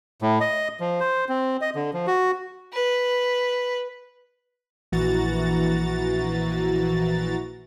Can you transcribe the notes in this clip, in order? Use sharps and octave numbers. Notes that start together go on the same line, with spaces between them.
A2
D#5
F3
C5
C4
D#5
D3
F3
F#4
B4
A#1 E3 F#4 A#5 A6